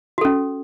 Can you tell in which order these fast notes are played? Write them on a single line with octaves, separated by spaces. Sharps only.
F#4 A4 C#4